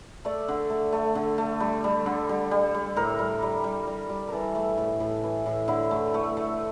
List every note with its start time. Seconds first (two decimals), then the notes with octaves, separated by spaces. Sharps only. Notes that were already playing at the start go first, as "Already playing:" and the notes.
0.25 A3 D5
0.48 D3
0.70 A3
0.92 A3
1.15 D3
1.38 A3
1.60 G3
1.84 G3
2.06 D3
2.29 G3
2.51 G3
2.74 G3
2.96 A2 A#4
3.19 G3
3.42 G3
3.64 G3
3.87 G3
4.09 G3
4.28 E3 A4 A#4
4.55 A3
4.78 A2
5.00 A2
5.24 E3
5.46 A2
5.68 D3 E4
5.91 A3
6.14 A3
6.37 A3